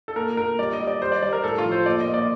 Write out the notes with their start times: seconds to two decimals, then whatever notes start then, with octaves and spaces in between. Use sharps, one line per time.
0.08 A4
0.16 A#2 A#4
0.37 A#2 A#4
0.59 G3 D5
0.73 D#5
0.80 G3
0.87 D5
1.02 G3 C5
1.12 D5
1.22 G3 D5
1.33 A#4
1.44 A2 A4
1.58 F4
1.64 F3
1.72 C5
1.86 A#2 D5
2.00 D#5
2.07 A#2
2.14 D5